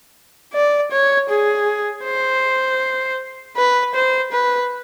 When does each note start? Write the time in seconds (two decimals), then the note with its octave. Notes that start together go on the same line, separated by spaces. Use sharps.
0.53 D5
0.91 C#5
1.29 G#4
2.05 C5
3.57 B4
3.94 C5
4.32 B4